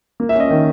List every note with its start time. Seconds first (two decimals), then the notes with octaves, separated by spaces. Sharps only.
0.20 A#3
0.29 E5
0.35 C#4
0.40 D#5
0.50 D#3